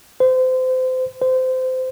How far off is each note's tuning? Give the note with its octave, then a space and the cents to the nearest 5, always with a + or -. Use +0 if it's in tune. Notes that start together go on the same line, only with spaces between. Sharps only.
C5 -30
C5 -25